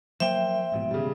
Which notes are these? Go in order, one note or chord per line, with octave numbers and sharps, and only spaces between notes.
F3 F#3 A#3 C5 E5 G5 G7
A1 G#2 B2
C#3 G3